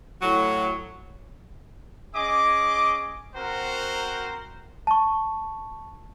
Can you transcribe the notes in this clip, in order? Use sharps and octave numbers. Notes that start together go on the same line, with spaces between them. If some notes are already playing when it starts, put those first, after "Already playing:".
A2 F#3
C#4 G#4 D#5 D6
C4 F#4 A#4 C5 F#5 A#5
A5 C#6